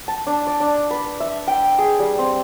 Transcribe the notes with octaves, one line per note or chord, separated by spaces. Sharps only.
A5
D4
D5
D4
B4
E5
G5
G#4
G3
C4